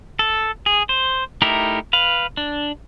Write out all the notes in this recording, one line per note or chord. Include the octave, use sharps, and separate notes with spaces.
A4
G#4
C5
A3 D#4 E4 G4 A#4
B4 F5
D4